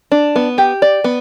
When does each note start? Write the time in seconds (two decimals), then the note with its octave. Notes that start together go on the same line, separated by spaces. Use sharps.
0.12 D4
0.36 B3
0.58 G4
0.82 D5
1.04 B3